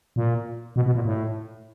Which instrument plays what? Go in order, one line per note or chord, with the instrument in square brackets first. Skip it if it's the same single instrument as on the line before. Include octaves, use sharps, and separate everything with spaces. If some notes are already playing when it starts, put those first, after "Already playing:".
[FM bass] A#2
B2
B2
A#2
A2